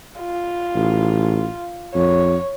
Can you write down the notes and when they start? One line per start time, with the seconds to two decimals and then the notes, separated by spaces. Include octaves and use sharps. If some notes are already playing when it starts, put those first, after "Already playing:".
0.20 F4
0.75 A1
1.95 F2 C#5